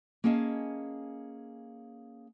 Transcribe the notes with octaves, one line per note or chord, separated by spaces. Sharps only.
A#3 C#4 G#4 D#5 F5 A5